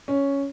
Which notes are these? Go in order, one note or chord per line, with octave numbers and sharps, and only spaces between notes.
C#4